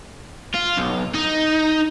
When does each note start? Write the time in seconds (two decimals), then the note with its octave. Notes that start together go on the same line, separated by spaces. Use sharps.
0.54 F4
0.77 B1
1.15 D#4